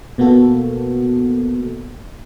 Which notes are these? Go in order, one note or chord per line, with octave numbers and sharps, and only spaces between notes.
B2 A#3 B3 F#4 A4